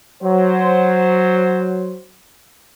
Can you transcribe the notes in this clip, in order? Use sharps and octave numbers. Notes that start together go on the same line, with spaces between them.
F#3 C5